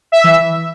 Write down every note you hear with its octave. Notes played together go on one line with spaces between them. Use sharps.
E5
E3